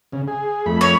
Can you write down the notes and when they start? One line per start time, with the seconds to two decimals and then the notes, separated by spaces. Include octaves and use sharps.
0.12 C#3
0.28 G#4
0.66 F2 A3 B5
0.81 C#5